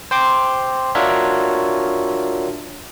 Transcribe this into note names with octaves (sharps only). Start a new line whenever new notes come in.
C5 G5 C6 D6
D4 F4 F#4 A#4 C#5 E5